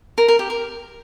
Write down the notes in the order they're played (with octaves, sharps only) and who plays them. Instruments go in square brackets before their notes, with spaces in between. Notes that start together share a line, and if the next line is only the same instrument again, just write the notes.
[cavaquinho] A#4
A#4
G4
A#4